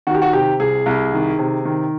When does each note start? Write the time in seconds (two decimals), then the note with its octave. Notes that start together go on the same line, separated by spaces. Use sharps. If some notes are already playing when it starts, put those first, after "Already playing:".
0.07 D#3 F#4
0.14 G4
0.22 F#4
0.33 C3 G4
0.60 C2 G#4
0.86 C2
1.13 D#3
1.39 C3
1.65 D#3